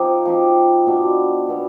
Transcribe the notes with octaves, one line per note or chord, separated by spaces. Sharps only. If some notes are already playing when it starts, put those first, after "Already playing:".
Already playing: F3 C4 D#4 G4
F3 C4 D#4 G4
B2 B3 D4
B2 B3 D4